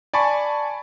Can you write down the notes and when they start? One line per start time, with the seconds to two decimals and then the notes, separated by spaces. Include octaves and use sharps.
0.14 D5 G#5 A5 B5 C#6